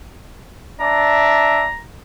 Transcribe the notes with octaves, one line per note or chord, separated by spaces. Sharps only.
D4 D5 E5 A#5